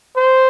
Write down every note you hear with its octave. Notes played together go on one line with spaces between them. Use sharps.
C5